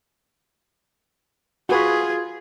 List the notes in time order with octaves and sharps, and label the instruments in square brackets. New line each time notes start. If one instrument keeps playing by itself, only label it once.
[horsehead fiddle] F4 G#4 [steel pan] F#4 B4